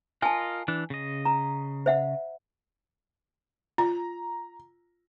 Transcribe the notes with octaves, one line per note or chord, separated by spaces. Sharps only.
F4 A#4 D#5 G#5 A5
E3 D4
C#3 D#5
A#5
C5 E5 F#5
F4 A#5